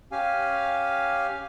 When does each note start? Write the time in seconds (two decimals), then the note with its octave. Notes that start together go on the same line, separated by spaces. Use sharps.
0.12 C#4 G4 F5 G#5